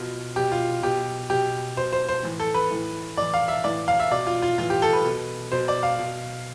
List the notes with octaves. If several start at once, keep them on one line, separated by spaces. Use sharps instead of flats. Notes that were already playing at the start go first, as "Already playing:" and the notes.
Already playing: B2 F4
B2 G4
F4
B2 G4
B2 G4
B2 C5
C5
C5
A2 E3
A4
B4
A2 E3
A2 E3 D5
F5
E5
A2 E3 D5
F5
E5
B2 D5
F4
F4
A2 E3 F4
G4
A4
B4
B2
B2 C5
D5
F5
B2